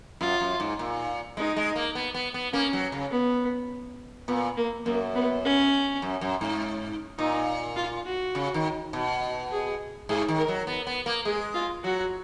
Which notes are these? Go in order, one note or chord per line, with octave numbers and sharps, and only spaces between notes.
F#2 F4
F#2
G#2
A#2
G#3 D#4
G#3
A#3
B3
B3
B3
A#3 C#4
F#3
C#3
B3
A#2 B3
A#3
F#2 A#3
B3
C#4
F#2
F#2
G#2
A#2 D#4
F4
F#4
C#3
D#3
B2
G#4
G#2 G#4
D#3
A#4
F#3
B3
B3
A#3
G#3 G#4
F4
F#3 F#4